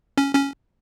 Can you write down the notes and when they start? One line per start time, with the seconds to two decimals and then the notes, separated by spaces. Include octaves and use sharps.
0.18 C#4
0.35 C#4